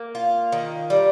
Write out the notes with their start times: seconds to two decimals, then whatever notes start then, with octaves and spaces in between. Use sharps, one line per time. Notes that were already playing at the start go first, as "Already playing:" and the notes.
Already playing: A#3
0.15 F4
0.52 D#3
0.90 G3